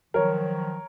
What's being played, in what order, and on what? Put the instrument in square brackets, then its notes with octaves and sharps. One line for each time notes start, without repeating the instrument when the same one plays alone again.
[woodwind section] D#3 F3 F#3 [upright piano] A#4 C#5